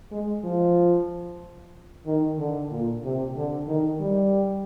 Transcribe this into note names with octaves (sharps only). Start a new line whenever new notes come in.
G#3
F3
D#3
D3
A#2
C3
D3
D#3
G3